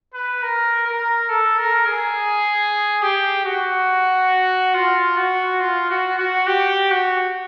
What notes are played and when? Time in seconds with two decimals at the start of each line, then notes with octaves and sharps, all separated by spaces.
0.14 B4
0.43 A#4
0.86 A#4
1.29 A4
1.58 A#4
1.86 G#4
3.02 G4
3.45 F#4
4.74 F4
5.17 F#4
5.60 F4
5.89 F#4
6.18 F#4
6.47 G4
6.91 F#4